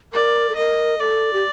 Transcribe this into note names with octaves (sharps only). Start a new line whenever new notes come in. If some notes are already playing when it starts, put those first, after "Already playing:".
A#4 D5
A4
A#4 D#5
A4 D5
G4